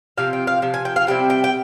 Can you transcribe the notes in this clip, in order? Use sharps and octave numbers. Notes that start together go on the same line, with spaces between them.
C3 F3 C4 F5
G5
F5
C3 F3
G#5
G5
F5
C3 G3 C4 E4 G5
G5
G5